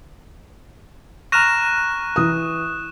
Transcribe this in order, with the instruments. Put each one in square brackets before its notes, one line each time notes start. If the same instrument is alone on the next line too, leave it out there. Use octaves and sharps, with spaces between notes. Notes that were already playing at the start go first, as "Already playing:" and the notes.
[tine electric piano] A#5 F6 A#6 [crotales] C#6 F#6 E7
[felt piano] E3 D#6